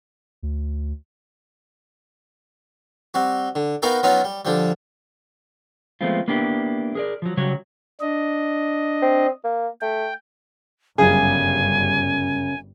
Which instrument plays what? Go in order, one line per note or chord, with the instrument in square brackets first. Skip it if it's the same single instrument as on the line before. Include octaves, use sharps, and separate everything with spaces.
[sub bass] D2
[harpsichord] G3 C4 F#4
D3
B3 D#4 F#4 A#4 F5 G5
F#3 B3 C#4 D#4 F4
G3
D3 F3 G3
[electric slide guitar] F3 G#3 A3 B3 C4 F4
A#3 B3 D4 E4 G4
G#4 A#4 D5
F3 F#3
C#3 F#3 G3 F#4 C#5
[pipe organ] D4 D#5
[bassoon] C4
A#3
[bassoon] A3 [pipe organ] G5
[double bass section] G1 G3 [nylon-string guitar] F#2 C#3 [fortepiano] G#4 [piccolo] G#5